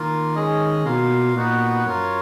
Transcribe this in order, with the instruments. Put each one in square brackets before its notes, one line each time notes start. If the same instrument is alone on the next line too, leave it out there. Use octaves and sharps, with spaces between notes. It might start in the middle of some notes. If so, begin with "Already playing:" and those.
Already playing: [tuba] D#3 [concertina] A#3 F4 A#4
[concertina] G#3 C#4 G#4 D#5
[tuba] B2 [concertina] A#3 F4 A#4 F5
[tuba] A#2 [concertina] B3 D#4 F#4 B4 F#5
[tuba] F#2 [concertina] F4 A#4 C#5